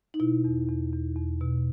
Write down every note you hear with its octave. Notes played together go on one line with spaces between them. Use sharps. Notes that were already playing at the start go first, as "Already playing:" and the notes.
D#4
B2 E4
E2
E2
E2
E2
B2